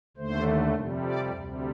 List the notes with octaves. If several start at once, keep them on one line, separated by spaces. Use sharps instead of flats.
D#2 D3 A3 C5
F2 C3 G3
D5
D2 C3 G3